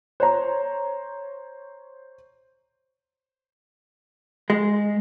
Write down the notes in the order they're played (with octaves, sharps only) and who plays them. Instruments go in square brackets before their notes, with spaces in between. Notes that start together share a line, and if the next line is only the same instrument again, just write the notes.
[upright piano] C5 C#5 A#5
[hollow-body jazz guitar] G#3